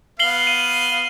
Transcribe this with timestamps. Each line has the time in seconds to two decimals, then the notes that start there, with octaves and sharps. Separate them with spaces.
0.19 B3 F5 C7 F#7 G7
0.47 D#7